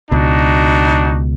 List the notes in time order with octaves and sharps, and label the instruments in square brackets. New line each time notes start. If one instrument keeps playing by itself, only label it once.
[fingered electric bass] C#2 B2 [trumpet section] D4 D#4 F#4